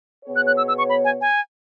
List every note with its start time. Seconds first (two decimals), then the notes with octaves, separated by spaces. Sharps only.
0.25 B2 B3 G#4 C#5
0.36 F#6
0.47 F#6
0.57 E6
0.68 E6
0.78 C#6
0.89 B5
1.05 G#5
1.21 G#5